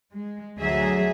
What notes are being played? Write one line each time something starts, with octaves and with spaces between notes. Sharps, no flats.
G#3
D2 F#3 G#4 E5